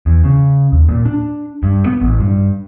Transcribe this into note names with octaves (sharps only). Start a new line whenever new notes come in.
E2
C#3
D#2
A#2
D4
G2
B3
A1
G2